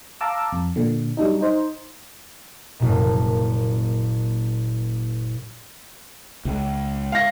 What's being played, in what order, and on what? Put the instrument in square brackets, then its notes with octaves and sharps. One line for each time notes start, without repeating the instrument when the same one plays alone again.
[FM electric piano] F5 A5 A#5 D6 E6
F2
A#2 D3
F#3 G3 D4 D#4
D#4 C5
[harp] F#1 A#2
[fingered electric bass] C#2
[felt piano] F5 A#6